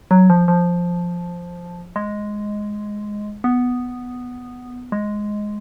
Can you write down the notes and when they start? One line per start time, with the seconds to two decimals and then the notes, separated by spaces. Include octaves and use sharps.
0.11 F#3
0.30 F3
0.48 F3
1.96 G#3
3.44 B3
4.92 G#3